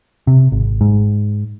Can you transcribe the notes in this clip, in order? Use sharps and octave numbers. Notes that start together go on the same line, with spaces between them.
C3
G#1
G#2